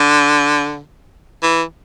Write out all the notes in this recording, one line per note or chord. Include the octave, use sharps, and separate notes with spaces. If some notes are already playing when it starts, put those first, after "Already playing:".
Already playing: D3
E3